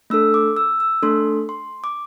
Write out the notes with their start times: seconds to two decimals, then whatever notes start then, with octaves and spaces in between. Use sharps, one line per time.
0.10 A3 D4 A4 E6
0.34 D6
0.57 E6
0.80 E6
1.03 A3 D4 A4 C6
1.49 C6
1.84 D6